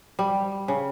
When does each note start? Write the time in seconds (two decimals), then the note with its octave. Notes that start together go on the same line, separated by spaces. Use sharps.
0.19 G3
0.68 C#3